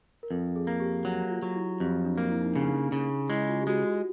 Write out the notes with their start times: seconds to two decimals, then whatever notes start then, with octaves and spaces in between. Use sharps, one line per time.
0.23 A#4
0.30 F2 A4
0.56 G#4
0.67 A#3
0.80 G4
1.05 F#3
1.30 F4
1.42 F#3
1.56 E4
1.80 F2 G4
2.05 D4
2.18 A#3
2.30 E4
2.41 D#4
2.52 C#3 D4
2.63 D#4
2.92 C#3
3.30 G#3 E4
3.49 F4
3.61 G4
3.67 G#3 F#4
3.86 F#4